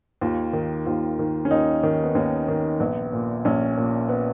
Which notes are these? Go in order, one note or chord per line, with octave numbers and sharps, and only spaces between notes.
D#2 F4
D#3
D#2 F4
D#3
C#4
D#2 D#4
D#3
B3
D#2 C#4
D#3
A#1 B3
A#2
A#1 C#4
A#2
B3